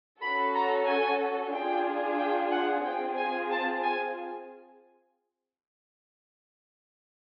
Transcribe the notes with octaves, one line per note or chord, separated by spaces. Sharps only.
C#4 F#4 A4 B5
A#5
G#5
D4 F4 G#4 G5
G5
F#5
C4 F4 G#4 G5
G#5
A5
G#5